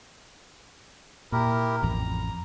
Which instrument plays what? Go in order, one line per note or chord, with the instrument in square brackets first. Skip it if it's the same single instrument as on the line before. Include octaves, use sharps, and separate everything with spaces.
[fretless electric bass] A#2 [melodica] E4 G4 A#4
[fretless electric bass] A1 F2 [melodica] A#5